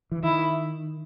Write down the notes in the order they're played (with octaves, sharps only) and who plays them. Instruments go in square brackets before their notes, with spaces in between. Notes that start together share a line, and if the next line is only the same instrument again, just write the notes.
[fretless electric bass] E3
[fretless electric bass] D#3 [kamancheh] E4